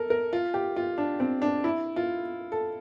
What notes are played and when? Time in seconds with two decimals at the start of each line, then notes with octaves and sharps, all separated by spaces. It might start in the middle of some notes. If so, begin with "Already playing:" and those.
Already playing: A4 A#4
0.10 A#4
0.33 F4
0.54 G4
0.76 F4
0.98 D4
1.20 C4
1.42 D4
1.64 E4
1.96 F4
2.52 A4